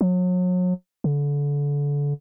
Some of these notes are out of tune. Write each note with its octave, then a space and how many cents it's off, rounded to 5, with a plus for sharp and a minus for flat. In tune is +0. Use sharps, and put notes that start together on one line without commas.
F#3 -35
D3 -30